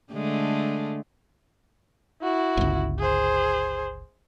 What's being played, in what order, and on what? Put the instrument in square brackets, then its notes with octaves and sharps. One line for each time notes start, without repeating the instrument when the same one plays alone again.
[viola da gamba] D3 G#3 A3
[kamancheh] E4 F#4
[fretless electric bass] G1 C#2
[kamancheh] G#4 C5